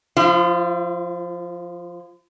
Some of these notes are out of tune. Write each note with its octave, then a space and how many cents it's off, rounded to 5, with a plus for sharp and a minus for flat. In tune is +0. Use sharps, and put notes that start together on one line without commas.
F3 +0 F4 -45